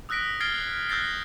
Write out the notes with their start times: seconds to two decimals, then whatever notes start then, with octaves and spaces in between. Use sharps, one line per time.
0.09 D#6 E6 F#6 A#6 B6 D7
0.40 F6 G#6 A6 C7 D7 G7
0.89 E6 F#6 G6 A6 A#6 C7